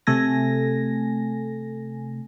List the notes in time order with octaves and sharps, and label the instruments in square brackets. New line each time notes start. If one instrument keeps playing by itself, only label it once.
[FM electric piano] C3 A3 A4 G#5 A#6